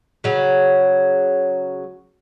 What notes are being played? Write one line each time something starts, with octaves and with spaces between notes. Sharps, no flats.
C#3 F#3